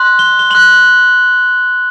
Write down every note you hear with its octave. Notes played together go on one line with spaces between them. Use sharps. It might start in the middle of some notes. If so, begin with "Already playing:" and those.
Already playing: C6 F#6
G7
G7
C6 F#6 F#7